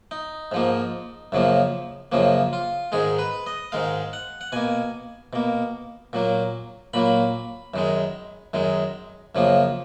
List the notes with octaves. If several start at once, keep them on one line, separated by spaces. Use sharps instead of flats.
D#4
G#2 F3 A#3
F#2 C#3 F3 A#3
F#2 C#3 F3 A#3
F4
G#2 D#3 G#3 G#4
B4
D#5
G#2 D#3 G#3 F5
F#5
F#5
B2 A#3 G#5
B2 A#3
A#2 F#3 A#3
A#2 F#3 A#3 B5
F#2 D#3 G#3
F#2 D#3 G#3
F#2 C#3 F3 A#3